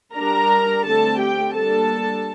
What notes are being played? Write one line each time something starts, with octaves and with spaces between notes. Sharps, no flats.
G3 D4 A#4 A#5
D3 A3 C4 A4 A5
G4 G5
G3 A#3 D4 A4 A5